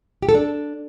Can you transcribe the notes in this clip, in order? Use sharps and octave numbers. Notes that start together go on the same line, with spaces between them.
G4
A4
D4